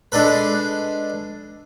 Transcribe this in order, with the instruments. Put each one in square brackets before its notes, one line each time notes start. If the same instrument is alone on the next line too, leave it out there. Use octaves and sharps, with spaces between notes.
[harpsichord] G#3 D4 A4 B4